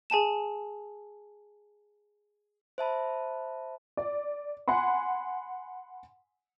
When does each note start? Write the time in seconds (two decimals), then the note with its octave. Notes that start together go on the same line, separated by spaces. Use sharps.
0.10 G#4 G#5 A5 E7
2.78 C5 E5 A5 B5
3.97 D5
4.68 F#5 G#5 B5 C6